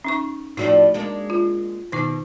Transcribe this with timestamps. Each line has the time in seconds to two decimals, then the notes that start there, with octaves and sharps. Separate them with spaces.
0.04 C#4 D#4 C#6
0.57 A2 F3 D4 D#4 F#4 D5
0.94 G#3 A#3 D4
1.30 F4
1.92 B2 D#3 D#4 D6